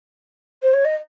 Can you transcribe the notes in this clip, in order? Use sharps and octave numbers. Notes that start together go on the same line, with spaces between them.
C5
C#5
D#5